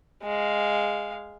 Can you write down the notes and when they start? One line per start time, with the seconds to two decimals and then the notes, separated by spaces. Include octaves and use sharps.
0.23 G#3 F5